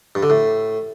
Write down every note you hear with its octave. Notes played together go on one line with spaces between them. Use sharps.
G2
D3
A2